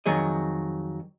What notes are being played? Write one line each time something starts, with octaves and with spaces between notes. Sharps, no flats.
F2 D#3 F#3 G#4 D#5